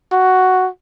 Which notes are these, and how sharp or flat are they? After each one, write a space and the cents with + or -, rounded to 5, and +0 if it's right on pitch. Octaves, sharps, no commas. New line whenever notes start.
F#4 +5